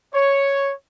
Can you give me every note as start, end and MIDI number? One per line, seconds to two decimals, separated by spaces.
0.14 0.73 73